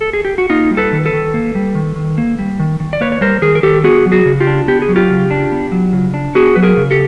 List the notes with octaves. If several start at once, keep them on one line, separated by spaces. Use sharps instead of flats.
A4
G#4
G4
F#4
A#3 D#4 F4
G3
A4 B4
D#3
A4 B4
D#3
A#3
G3
D#3
D#3
A#3
G3
D#3
D#3
D5
A#3 B4 C#5
C#5
G3 A#4 C5
D#3 G#4 A#4
A#4
D#3 G4 A4
B3 F#4 G#4
F#3
F#4 G#4
C#3
F4 G4
D4
B3 G4
G#4
F#3
F4 G4
C#3
D4
B3
F#3
C#3
D4
B3 F#4 G#4
F#3 B4
G#4 A#4
C#3
G4 A4